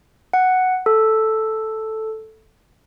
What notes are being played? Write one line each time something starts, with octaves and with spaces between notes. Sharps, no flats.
F#5
A4